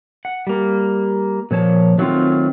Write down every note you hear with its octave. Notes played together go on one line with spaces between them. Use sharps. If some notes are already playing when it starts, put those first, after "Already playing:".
F#5
G3 A#3
A#2 F3 C#5 A5
D#3 F#3 A3 A#3 C4 F4